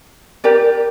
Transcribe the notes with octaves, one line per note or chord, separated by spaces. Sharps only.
G4 A#4 D5